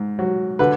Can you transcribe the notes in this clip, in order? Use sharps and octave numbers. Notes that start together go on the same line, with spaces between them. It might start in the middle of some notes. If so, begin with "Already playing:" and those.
Already playing: G#2
F#3
D3 B4